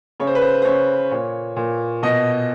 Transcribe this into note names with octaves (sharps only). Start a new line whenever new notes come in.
C#3 C#5
C5
B4
C5
C5
C#3 C#5
A#2 C#5
A#2
B2 D#5